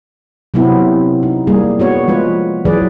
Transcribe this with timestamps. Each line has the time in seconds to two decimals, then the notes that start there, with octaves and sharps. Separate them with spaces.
0.54 C3 F#3 B3 C4 E4
1.23 D#4
1.47 G3 A#3 G#4
1.80 B3 F#4 C#5
2.08 F3 G#3 F4 B4
2.65 E3 F#3 G#4 B4 D5